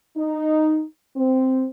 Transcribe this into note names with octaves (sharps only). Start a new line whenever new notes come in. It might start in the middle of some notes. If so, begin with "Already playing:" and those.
D#4
C4